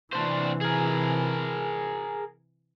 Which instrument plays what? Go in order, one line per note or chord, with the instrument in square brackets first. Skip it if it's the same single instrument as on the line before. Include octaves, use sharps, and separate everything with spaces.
[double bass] C3 E3 [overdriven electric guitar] D4 C5
[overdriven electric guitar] G#4 A#4